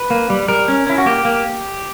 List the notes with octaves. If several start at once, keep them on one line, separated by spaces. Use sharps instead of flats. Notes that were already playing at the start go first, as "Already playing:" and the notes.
Already playing: B4
A#3
G3
G3 A#4
C#4
C#4 E4
F#4
A#3 G4
A#3